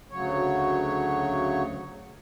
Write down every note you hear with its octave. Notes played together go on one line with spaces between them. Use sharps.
D2 C#3 F#3 C#5